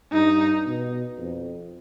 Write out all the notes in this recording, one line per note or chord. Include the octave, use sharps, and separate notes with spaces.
G2 D#4
B2
F2